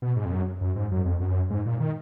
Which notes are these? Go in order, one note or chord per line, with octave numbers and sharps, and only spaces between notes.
B2
G#2
F2
F#2
F#2
G#2
F#2
F2
F#2
G#2
A#2
D#3